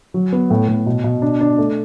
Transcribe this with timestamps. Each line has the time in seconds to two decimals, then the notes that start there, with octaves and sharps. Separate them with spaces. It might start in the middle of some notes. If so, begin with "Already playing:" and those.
0.14 F#3
0.32 B3
0.50 A2
0.68 A2
0.86 B2
1.04 B2
1.22 D4
1.40 D4
1.58 A3